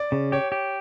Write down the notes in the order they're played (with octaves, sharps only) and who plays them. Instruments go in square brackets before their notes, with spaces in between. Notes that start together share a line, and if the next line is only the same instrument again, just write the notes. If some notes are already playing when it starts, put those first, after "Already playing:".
Already playing: [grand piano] D5
[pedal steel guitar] C#3
[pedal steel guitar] G4 [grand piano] C#5
[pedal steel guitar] G4